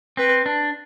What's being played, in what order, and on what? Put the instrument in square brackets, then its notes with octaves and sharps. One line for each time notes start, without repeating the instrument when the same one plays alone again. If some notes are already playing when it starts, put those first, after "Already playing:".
[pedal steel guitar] C4 [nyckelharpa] B4
[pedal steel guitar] D4